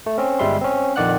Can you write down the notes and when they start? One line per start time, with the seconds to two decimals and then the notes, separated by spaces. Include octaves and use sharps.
0.06 A3
0.18 C4 C#4
0.39 G1 G3 G#3 E5 C6
0.62 C4 C#4
0.96 A#1 F2 D#3 D5 F#5 F#6